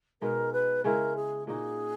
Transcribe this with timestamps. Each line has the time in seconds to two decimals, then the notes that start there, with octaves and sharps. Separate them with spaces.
0.21 B2 G#3 B3 D#4 A#4
0.53 B4
0.84 C#3 G#3 C#4 E4 A#4
1.16 G#4
1.47 A#2 A#3 D#4 F#4 G#4